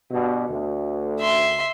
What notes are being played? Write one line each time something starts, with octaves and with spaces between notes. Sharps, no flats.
G2 B2
D2
E5 C6